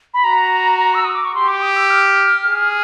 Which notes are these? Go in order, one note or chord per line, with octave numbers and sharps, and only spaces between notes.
B5
F#4 A#5
E6
D#6
D6
C#6
G4 C6
D6
D#6
E6
F6
G#4